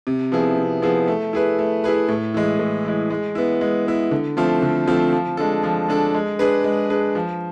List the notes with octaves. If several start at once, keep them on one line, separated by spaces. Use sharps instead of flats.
C3
F3 B3 E4 G#4
C3
F3 B3 E4 G#4
A3
E4 G#4 B4
A3
E4 G#4 B4
A2
E3 G#3
A2
E3 G#3
G#3
B3 E4
G#3
B3 E4
D3
F3 A3 C4 F4
D3
F3 A3 C4 F4
F3
G#3 D4 A4
F3
G#3 D4 A4
G#3
D4 G#4 B4
G#3
D4 G#4 B4
F3